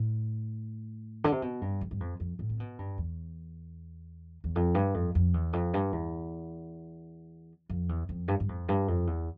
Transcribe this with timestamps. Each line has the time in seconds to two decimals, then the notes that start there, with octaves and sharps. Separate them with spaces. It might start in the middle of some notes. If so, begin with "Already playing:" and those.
Already playing: A2
1.24 D3
1.32 C3
1.42 B2
1.61 G2
1.81 F2
1.91 G2
2.00 F2
2.20 F2
2.39 A2
2.49 C3
2.60 B2
2.79 G2
2.98 E2
4.44 E2
4.56 F2
4.75 G2
4.94 F2
5.15 F2
5.34 E2
5.53 F2
5.74 G2
5.92 E2
7.70 F2
7.89 E2
8.09 F2
8.28 G2
8.40 G2
8.49 F2
8.68 G2
8.88 F2
9.07 E2